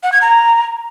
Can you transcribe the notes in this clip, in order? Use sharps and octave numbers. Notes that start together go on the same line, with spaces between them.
F#5
G#6
A#5